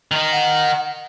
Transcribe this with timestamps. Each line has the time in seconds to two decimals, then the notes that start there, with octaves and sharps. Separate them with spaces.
0.11 D#3 D#4
0.33 F#5